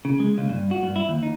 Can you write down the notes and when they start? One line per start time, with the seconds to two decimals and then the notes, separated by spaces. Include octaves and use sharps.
0.05 C#3
0.20 G#3
0.38 C#2
0.49 G2
0.71 F#4
0.83 G2
0.96 E4
1.09 D#2
1.23 D#4